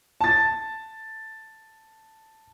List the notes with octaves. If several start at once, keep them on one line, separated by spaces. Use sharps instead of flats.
A5 A6